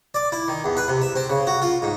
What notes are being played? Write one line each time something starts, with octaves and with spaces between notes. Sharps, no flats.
D5
E4
D#3
E2
B4
C3
E5
C4
C#3
F#4
F4
G#2